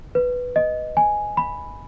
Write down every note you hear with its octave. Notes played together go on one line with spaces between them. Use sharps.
B4
D#5
G#5
B5